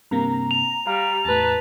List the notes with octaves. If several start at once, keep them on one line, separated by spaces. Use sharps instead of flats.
G2 C3 A#3 A#5
F7
G3 F5 A#5
E2 A2 B4 A5